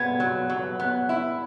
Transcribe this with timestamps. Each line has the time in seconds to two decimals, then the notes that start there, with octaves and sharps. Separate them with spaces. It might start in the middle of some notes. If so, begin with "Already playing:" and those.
Already playing: B3 G#6
0.20 F#3
0.50 F#3
0.80 B3
1.09 E4